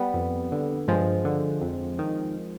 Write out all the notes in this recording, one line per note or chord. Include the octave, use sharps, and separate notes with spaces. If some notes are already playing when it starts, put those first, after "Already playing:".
Already playing: G3 B3
F2
D3
G2 F3 G#3
D3
F2
D#3